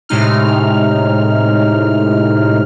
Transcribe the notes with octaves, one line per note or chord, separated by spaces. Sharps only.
A2 C3 G#3 D#4 F6